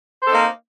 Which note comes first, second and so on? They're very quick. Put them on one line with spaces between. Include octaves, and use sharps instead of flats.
C5 A4 C4 D#4 A#3